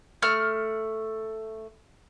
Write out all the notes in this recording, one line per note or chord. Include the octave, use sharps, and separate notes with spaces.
A3 F6